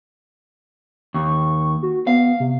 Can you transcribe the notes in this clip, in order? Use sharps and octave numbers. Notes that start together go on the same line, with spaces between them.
D#2 C#6
F#4
B3 F5
C3